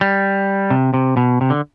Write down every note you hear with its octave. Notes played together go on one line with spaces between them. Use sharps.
G3
C3
C3
B2
C3
D3